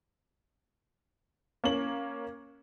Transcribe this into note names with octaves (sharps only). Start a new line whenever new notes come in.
A#3 C#4 F#7